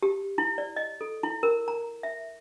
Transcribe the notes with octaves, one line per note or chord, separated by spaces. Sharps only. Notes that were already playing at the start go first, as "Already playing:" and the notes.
G4
E4
D5
D#5
A4
E4
A#4
A#5
E5